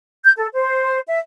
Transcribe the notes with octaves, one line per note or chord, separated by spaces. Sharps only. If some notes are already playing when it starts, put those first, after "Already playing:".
G6
A4
C5
E5